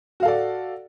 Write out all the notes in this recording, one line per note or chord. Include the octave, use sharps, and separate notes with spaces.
F#4 A4 D5 F5